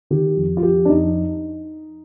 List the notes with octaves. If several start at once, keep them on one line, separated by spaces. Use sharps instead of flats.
D#3 G4
F2
F4
F2 G4
D4
F2 D#4